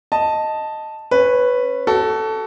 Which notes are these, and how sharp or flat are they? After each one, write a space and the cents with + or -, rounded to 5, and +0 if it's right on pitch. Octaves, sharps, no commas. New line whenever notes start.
D#5 +0 A5 +0
C#4 -20 B4 +0
F#4 +30 A4 +0